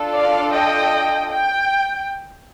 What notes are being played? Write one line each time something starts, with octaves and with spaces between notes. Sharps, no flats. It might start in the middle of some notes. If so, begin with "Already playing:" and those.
Already playing: D4 F4 A4
D5 F5
D#5 G5
G5